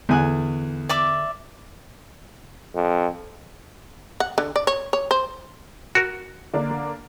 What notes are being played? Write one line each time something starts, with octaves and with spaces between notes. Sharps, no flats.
E2 D3 G#5 F#6
D5 E5 D6
F2
F#5
D3
D5
C#5
C#5
C5
F#4 A#4
D3 A#3 D4